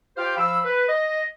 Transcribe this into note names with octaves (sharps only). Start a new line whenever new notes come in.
F4 G4 C5 F5 G5
F3 F5 B5 E6
B4
D#5